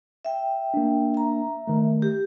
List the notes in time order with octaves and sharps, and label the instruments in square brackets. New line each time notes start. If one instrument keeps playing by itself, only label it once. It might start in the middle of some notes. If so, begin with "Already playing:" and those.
[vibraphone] E5 G5
[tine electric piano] A#3 D4
[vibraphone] E5 A#5
[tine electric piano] D#3 A3
[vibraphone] G4